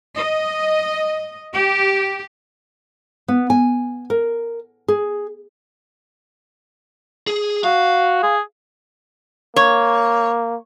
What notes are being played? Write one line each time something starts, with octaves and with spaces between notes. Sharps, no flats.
D#5
G4
B3
G#5
A#4
G#4
G#4
F#4 F5
G#4
A#3 C#5